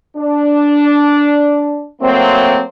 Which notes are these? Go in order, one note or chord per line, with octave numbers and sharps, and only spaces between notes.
D4
F#3 A3 A#3 C4